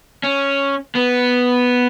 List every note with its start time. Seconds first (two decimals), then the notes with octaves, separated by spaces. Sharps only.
0.23 C#4
0.95 B3